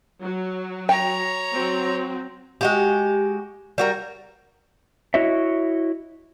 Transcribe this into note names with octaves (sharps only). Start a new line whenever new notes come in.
F#3
C#5 G5 A#5
F#3 C4
G#3 F#4 G4
G3 F#4 A#4
E4 F#4 C#5 D#5 E5